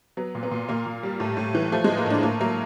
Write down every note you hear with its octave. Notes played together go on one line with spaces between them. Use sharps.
F#3 B3
A#2
B3
A#2
A#2 A#3
A#2
G3
A2
A2
E3
F3 A3
A2 G#3
A#3
A2 D4
A2 A#3
F#3 A#3